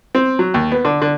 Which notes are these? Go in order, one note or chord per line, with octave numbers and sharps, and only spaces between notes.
C4
F#3
D#2
B3
D3
D3